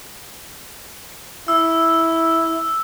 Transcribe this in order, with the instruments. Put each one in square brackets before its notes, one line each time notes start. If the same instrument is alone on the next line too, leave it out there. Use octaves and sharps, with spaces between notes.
[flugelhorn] E4 [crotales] E6